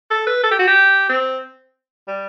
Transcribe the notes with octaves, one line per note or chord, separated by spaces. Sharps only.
A4
B4
A4
G4
F#4
G4
C4
G3